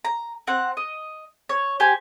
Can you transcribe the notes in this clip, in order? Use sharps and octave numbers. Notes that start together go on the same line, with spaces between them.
A#5
C4 F#5
D#5
C#5
G4 C5 G#5